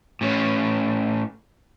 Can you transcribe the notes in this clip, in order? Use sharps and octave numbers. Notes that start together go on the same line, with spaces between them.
A2 C#4